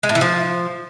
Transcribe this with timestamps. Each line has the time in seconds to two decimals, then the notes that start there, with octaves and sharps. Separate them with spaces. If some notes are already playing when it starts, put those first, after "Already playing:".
0.03 G#3
0.09 A2
0.15 E3
0.21 F3